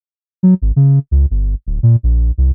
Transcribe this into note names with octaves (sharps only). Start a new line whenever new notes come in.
F#3
G#1
C#3
C#2
G1
D1
A#2
A#1
C2